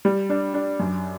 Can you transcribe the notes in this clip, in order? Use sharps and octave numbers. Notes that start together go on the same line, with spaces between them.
G3
D4
D4
F#2